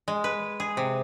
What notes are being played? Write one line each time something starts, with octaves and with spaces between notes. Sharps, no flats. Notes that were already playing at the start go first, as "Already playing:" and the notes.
G#3
B4
G#4
C3